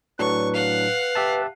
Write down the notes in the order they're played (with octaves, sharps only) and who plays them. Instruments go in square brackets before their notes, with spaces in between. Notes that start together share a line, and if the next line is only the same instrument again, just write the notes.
[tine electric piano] A2 F#3 D4 [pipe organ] B4 [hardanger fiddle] C#6
[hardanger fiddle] F5 F#5
[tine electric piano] G4 E5 A5